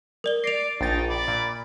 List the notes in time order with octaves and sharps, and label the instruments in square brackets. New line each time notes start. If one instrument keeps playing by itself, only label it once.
[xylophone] A#4 D5 G7
[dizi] D5 [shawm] D6 [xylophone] A#6 F7 [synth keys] C7
[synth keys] A#1 A6 [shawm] D#4 [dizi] G5
[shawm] D5 [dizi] B5
[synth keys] A#2